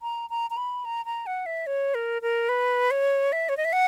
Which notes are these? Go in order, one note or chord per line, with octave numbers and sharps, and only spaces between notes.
A#5
A#5
A#5
B5
A#5
A#5
F#5
E5
C#5
A#4
A#4
B4
C#5
E5
C#5
D#5
E5
F#5